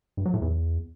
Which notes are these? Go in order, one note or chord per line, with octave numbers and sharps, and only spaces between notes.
G2
F#3
A2
E2